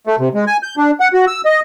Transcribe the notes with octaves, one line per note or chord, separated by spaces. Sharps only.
A3
C3
G#3
G#5
G6
D4
F#5
F#4
E6
D#5